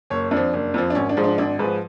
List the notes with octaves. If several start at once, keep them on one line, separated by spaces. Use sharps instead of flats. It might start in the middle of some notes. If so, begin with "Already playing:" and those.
F#1 C#5
F2 D4
F3
F#1
F2 F3
D4
G#1 C#4
D4
G#2 F3
D4
G#1 D4
G#2 F3 B4